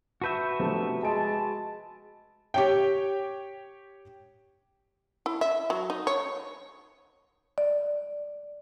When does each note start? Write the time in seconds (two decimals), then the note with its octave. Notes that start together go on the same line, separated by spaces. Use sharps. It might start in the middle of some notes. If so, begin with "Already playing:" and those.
0.22 F#4 B4 E5 A5 G6
0.59 G1 C3 F3 A3
1.03 G#3 G#5 A5 D7
2.54 G4 C#5 G5
5.26 E4
5.41 E5
5.70 F#3
5.90 D#4
6.07 C#5
7.58 D5